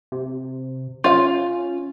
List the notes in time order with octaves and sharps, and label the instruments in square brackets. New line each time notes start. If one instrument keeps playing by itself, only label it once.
[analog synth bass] C3
[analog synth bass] C#4 [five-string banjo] F4 F5